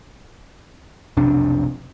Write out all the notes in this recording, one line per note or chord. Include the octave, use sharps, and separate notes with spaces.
B1 F2 C3 D4